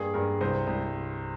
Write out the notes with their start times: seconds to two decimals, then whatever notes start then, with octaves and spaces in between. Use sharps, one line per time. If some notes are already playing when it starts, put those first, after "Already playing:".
Already playing: G2 A#3 G#4
0.14 G2 A#4
0.41 C2 C5
0.67 C2